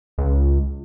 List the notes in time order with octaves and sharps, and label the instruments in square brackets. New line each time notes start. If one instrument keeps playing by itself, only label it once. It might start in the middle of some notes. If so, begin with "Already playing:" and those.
[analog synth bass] C#2